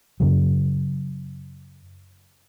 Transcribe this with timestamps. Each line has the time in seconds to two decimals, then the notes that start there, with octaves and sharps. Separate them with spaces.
0.20 F#2 C#3 F#3